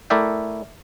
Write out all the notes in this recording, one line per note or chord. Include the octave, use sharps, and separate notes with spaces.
A3 E4 A#4 D5 E5 G5